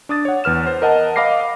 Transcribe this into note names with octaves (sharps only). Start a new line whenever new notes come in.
D4 D6 D#6 A6
C#5 F#5
E2 B4 F6 E7
C5
A#4 D#5 F#5 A5
D#5 F5 B5 D6 A#6 C7